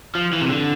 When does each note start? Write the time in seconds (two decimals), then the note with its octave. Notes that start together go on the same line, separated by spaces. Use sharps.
0.15 F3
0.33 E3
0.41 C3
0.49 D3